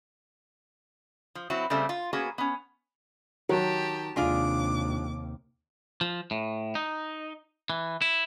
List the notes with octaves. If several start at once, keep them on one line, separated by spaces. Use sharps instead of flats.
F3
F#3 C4 E4 F#4
C#3 G3 A3 C4
F4
A#3 B3 C#4 F#4 G#4
B3 C#4
D#3 F#3 G4 A5
D#2 C3 G#3 D4 F4 D6
F3
A2
D#4
E3
E4